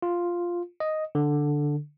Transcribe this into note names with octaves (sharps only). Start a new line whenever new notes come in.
F4
D#5
D3